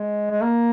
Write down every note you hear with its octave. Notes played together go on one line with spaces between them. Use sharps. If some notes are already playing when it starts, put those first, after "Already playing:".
Already playing: G#3
G#3
A#3